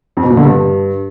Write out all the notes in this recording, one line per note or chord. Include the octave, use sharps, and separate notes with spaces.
F2
B2
A#2
D3
G2